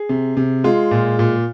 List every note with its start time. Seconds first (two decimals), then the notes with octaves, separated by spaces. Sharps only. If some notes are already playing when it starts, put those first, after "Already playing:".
Already playing: G#4
0.09 C3
0.37 C3
0.64 G#3 F4
0.91 A#2
1.19 A#2